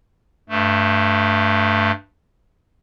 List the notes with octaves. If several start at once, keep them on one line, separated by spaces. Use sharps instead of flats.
G2 A3